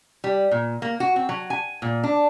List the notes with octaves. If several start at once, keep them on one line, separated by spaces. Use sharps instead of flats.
G3
A#2
A#3
F#4
C4
F#3
G#5
A#2
D4